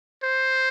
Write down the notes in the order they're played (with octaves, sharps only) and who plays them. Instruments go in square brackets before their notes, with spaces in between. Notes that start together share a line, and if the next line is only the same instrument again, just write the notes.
[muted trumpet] C5